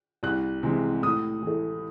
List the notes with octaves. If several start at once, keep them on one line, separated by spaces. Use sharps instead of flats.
C2 F#6
C3 E3 G#3
A2 D#6
E3 A3